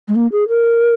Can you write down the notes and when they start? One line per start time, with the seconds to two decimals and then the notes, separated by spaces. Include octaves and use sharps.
0.08 G#3
0.15 A#3
0.32 G#4
0.48 A#4